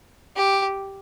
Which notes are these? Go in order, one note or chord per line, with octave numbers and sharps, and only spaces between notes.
G4